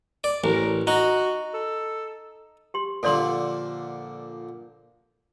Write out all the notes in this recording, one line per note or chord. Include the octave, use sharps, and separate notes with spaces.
D5
A1 A#4
D#4 F#4
A4
G4 C6
A#2 D3 F3 A4 D5 C6